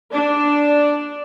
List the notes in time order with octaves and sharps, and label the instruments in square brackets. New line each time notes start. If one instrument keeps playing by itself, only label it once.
[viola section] D4